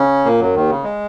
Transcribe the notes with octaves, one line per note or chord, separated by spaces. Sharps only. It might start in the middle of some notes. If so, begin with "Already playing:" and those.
Already playing: C#3 C#4
A#2 A#3
F#2 F#3
D#2 D#3
C#3
G#3